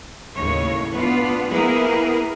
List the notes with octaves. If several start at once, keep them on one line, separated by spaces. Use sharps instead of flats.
D#2 A2 C#3 C#5
B3 D4 F4
A#3 B3 E4 G#4 A#4